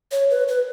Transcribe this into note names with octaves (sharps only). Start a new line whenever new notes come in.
C#5
B4
B4